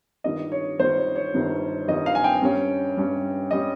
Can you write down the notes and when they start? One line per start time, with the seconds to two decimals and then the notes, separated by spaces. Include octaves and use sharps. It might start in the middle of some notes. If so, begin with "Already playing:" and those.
0.24 G1 G2 D#3 G3 D#5
0.52 C#5
0.79 G1 G2 D#3 G3 C5
0.97 C#5
1.16 C#5
1.34 G1 G2 D#3 G3
1.87 G1 G2 D#3 G3 D#5
2.06 F5
2.15 G#5
2.24 G5
2.42 G2 G3 C#4
2.97 G2 G3 C#4
3.51 G3 C#4 D#5